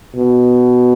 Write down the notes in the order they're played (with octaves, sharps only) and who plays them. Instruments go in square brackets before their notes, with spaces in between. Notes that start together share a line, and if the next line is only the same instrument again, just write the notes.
[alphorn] B2